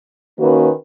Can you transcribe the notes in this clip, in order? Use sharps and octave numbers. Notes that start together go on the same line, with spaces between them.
D#3 A#3 C#4 F#4 B4